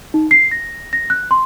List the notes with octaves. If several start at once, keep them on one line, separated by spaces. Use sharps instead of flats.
D#4
C7
A#6
A#6
F#6
C6